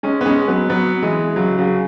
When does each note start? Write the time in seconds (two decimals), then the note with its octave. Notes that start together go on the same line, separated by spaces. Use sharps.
0.03 G#3 C#4
0.21 B3
0.26 G#3 C#4
0.48 F#3 B3
0.70 F#3 B3
1.02 E3 G#3
1.36 C#3 F#3
1.58 C#3 F#3